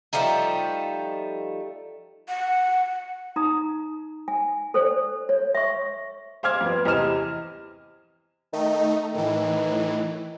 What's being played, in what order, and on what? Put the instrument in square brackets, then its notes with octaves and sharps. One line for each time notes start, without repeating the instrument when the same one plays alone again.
[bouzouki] F3 G3 A3 D#4
[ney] F#5
[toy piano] D#4 A#5 D#6
G#5
A4 C5 D5
C#5
E5 C#6
[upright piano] C5 F5 D6 F6 G#6
F2 B3
E2 C3 D#5 F6 E7
[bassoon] D#3 [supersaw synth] A3 D#4
[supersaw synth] A2 E3 [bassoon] D#3